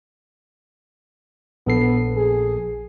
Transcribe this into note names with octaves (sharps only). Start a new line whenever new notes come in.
A#1 B3 A4 C7
G#4